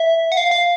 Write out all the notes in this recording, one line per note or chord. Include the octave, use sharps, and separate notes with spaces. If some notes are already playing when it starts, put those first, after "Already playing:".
Already playing: E5
F#5
F5
F5